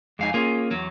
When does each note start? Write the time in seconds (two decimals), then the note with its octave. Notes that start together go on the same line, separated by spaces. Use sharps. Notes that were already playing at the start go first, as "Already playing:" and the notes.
0.19 F2 G#3 D#4 F5 G#5
0.34 A#3 C#4 F4 G#4
0.71 E2 F#3